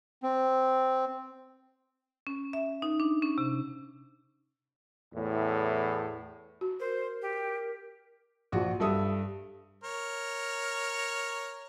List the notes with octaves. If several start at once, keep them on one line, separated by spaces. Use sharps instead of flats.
C4
C#4
E5
D#4
D4
C#4
C3
E2 A2
F#4
A#4 C5
G4
A#1 F3 F#4
G2 A4 E5 D#6
A#4 C#5